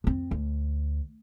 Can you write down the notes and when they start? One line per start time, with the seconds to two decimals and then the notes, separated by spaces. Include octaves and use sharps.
0.04 F2 C4
0.31 D2